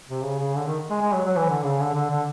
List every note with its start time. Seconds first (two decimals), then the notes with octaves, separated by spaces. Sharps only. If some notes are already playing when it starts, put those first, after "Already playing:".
0.09 C3
0.24 C#3
0.40 C#3
0.56 D3
0.67 D#3
0.91 G#3
1.02 G#3
1.14 F#3
1.25 F#3
1.36 E3
1.49 D3
1.64 C#3
1.80 D3
1.95 D3
2.10 D3